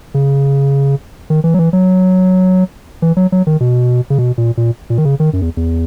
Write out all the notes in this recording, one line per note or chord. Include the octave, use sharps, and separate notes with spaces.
C#3
D#3
E3
F#3
E3
F#3
E3
F#3
F#3
D#3
B2
C#3
B2
A#2
A#2
A#2
D#3
C#3
D#3
F#2
E2
E2